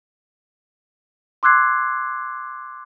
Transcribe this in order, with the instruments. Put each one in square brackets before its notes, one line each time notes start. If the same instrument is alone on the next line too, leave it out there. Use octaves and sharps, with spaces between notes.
[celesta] C6 D6 E6 F#6 G#6 C7